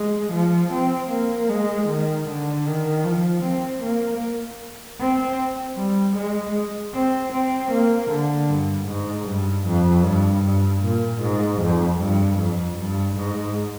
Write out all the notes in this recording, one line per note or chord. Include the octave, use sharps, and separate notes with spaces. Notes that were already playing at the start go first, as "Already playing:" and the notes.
Already playing: G#3
F3
C4
A#3
G#3
D#3
D3
D#3
F3
C4
A#3
C4
G3
G#3
C4
C4
A#3
D3
G2
G#2
G2
F2
G2
G2
A#2
G#2
F2
G2
F2
G2
G#2